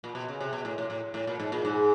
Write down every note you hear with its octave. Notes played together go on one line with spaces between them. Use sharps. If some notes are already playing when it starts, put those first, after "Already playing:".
A#2
B2
C#3
C3
B2
A2
A2
A2
A2
A#2
G#2
A#2
G#2